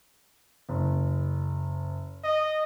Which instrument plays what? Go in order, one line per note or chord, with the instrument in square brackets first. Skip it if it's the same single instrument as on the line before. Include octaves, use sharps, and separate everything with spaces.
[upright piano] F#1
[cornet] D#5